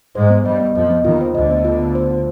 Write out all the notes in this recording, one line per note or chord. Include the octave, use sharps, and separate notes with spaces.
G#2 G#3 C5
B3
G2 G3 D#5
B3
F2 F3 D#5
B3
D#2 D#3 F4
C5
D2 D3 D#5
B3
F4
B3
C5
F4